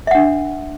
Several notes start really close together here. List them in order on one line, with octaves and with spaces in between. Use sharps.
E5 F#5 D4